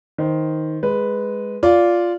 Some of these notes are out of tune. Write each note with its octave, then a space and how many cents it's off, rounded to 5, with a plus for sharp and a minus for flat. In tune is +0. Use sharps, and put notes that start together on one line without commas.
D#3 +10 C5 +0
G#3 +0 B4 +0
F4 +0 D5 -15